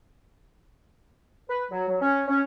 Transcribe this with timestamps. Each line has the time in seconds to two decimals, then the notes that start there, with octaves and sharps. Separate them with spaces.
1.49 B4
1.71 F#3
1.89 F#3
2.01 C#4
2.28 C#4